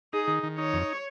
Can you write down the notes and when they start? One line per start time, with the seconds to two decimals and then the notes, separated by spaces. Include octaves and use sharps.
0.13 D#4 G#4
0.28 D#3
0.43 D#3
0.58 D#4 C#5
0.73 F2